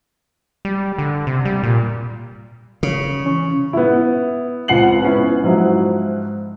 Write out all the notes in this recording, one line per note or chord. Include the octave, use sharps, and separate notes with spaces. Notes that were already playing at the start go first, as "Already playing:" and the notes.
G3
D3
C3
G3
A#2
C#3
E3 C#4 C#6
B3 E4
C#2 C4 F#5 C7 F#7
B3 C#4 E4
G#2 F3 F#3 E4